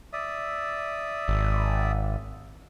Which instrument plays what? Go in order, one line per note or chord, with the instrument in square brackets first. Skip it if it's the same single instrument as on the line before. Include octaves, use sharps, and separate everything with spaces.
[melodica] D5 E5 D#6
[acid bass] G#1